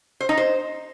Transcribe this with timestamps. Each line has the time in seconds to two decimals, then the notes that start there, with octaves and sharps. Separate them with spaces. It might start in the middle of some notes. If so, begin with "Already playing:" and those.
0.20 C5
0.29 D#4
0.37 C5